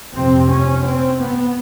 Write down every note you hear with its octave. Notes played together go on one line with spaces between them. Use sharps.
F2 C3 C4
C#4
C4
B3